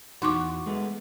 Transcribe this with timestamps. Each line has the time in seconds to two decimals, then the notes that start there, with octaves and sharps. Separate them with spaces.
0.22 E2 D#4 F#4 C6 D6
0.66 G#3 A3 B3